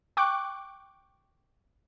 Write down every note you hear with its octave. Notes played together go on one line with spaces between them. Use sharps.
G5 C#6 D6 F#6